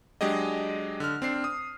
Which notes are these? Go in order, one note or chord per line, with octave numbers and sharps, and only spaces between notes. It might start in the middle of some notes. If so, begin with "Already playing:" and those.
F#3 G#3 D4 G4 G#4 D#5
D3 F6
C4 D4 C7
D#6